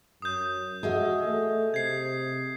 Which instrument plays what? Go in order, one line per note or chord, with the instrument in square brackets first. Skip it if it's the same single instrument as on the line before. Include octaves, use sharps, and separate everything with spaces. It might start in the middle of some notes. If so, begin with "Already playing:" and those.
[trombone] F#2 [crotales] D#6 G6
[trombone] F#4 [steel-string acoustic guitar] G#4 D#5 E5
[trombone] A3
[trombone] C3 [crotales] G#6 C7